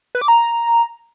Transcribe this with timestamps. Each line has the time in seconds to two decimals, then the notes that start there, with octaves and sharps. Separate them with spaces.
0.15 B4
0.21 D6
0.28 A#5